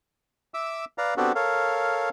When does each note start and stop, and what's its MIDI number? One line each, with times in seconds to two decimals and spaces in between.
0.54 0.85 76
0.54 0.85 86
0.54 0.85 88
0.98 1.14 71
0.98 1.14 74
0.98 1.14 77
0.98 1.14 82
1.17 1.32 59
1.17 1.32 60
1.17 1.32 62
1.17 1.32 66
1.17 1.32 67
1.17 1.32 69
1.35 2.09 69
1.35 2.09 70
1.35 2.09 73
1.35 2.09 77